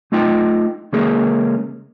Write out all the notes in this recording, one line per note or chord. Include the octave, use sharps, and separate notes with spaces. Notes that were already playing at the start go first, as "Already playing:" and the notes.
A3 D#4 F4 D#5 G5
C#3 G#3 A#3 C#4 G#4 A#4